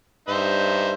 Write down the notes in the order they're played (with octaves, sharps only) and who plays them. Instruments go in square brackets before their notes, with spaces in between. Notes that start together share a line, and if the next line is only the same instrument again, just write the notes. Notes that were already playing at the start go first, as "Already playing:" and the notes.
[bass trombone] G2 [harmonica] D#4 C5 E5